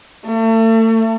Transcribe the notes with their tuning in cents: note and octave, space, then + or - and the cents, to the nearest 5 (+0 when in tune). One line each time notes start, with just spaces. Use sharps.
A3 +35